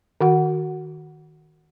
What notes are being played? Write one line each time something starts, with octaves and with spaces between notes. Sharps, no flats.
D#3 F#4 F#5